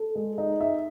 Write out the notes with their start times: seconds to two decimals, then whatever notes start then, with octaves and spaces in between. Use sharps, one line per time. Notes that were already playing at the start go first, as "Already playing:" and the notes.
Already playing: A4
0.15 G#3
0.38 D#4
0.61 E5